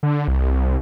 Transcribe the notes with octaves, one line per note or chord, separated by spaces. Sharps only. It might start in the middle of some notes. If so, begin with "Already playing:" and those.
D3
C2